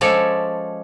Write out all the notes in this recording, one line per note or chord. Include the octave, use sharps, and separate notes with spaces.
F3 G#3 C#4 A4 C#5 D5